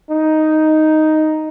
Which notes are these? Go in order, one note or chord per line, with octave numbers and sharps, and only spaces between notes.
D#4